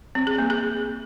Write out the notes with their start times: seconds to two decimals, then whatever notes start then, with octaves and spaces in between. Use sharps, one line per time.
0.15 C4
0.27 G#4
0.38 A#3
0.50 G#4